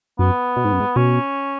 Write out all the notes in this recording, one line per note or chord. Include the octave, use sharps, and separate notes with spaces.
F#2 B3
B2
G#2
F#2
G#2
B2 C#4